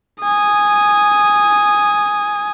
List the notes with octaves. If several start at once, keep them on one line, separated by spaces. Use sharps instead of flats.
G#5 D#6